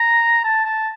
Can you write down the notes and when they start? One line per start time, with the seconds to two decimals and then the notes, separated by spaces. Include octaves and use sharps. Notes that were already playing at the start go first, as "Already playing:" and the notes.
Already playing: A#5
0.44 A5
0.64 A5